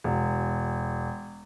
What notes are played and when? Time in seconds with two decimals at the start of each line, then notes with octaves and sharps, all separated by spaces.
0.04 E1